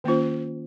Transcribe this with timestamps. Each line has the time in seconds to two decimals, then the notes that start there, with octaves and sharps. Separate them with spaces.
0.04 D#3 A#3 C#4 F4 C5